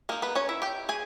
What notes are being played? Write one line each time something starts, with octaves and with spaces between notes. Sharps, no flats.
G#3 A#3 D#4 A#4
B3 B4
C#4 C#5
E4 E5
G4 G5
G#4 G#5